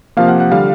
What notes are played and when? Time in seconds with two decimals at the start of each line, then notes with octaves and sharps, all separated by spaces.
0.17 C3 F3 A#3 F5
0.28 F#5
0.40 F#5
0.52 D3 G3 F5